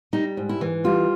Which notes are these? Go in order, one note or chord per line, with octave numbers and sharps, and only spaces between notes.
G3 D#4
G#2
E4
E3
G3 F4